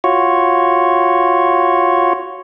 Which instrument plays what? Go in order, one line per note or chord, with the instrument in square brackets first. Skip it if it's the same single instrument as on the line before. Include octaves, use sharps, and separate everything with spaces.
[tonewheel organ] F4 F#4 C#5